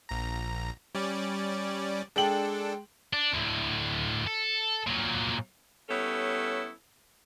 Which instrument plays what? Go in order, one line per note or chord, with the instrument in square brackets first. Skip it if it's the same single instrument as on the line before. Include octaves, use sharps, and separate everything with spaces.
[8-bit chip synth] A#1 A#5
G3 C#4 D5
[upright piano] G#3 G5 F#7 [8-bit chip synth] D4 A4
[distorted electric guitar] D4
D2 A2
A4
A#2 F#3
[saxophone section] G3 B3 C#4 E4 A4 C#5